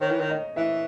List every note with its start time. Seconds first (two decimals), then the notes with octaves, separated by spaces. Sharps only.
0.01 D#3 C#5
0.11 E3
0.20 D#3
0.30 D#5
0.56 E3 E5